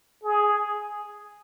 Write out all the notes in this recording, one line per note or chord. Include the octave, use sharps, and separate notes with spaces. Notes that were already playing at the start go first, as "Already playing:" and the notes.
G#4